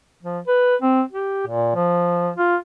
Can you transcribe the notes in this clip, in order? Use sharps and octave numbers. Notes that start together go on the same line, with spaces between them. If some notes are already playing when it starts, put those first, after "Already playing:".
F3
B4
C4
G4
A#2
F3
F4